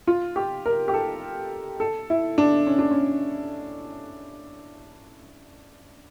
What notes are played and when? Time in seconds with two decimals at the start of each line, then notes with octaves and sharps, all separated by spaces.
0.07 F4
0.36 G4
0.66 A#4
0.88 G4
0.93 A4
1.80 A4
2.10 E4
2.38 D4
2.67 C#4
2.79 D4
2.91 C#4